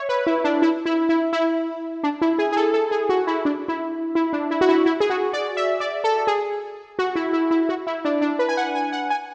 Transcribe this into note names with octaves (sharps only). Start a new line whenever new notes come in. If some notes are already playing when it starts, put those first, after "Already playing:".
Already playing: C#5 E5
B4
E4
D4
E4
E4
E4
E4
D4
E4
G#4
G#4
A4
A4
G#4
F#4
E4
D4
E4
E4
D4
E4
F#4
E4
E4
G#4
F#4
D5
E5
D5
A4
A4
G#4
F#4
E4
E4
E4
F#4
E4
D4
D4
B4
G#5
F#5
G#5
F#5
G#5